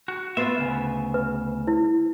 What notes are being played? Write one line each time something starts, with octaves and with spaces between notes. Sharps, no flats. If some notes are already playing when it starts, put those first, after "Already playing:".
F#4
B3 F4 C5 E5
D2 A#2 C#3
B4
E4